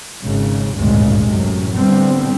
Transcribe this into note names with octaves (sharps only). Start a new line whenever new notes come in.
G#1 G#2 C#3
G#1 D2 G2 A#2 C#3 G#3
F#2 A2 C3
A2 D3 G3 B3 C4